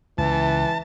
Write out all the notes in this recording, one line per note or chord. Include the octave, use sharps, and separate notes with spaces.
C#2 E3 A5